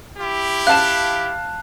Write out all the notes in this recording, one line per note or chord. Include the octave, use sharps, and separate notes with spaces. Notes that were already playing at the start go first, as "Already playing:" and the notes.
E4 G4
F5 A5 F#6 E7